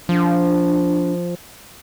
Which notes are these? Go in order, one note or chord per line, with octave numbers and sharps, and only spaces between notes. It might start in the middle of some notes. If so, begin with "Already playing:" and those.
F3 D4